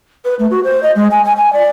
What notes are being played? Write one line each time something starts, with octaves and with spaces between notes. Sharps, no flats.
B4
A3
F#4
C5
D#5
G#3
G#5
G#5
G#5
D5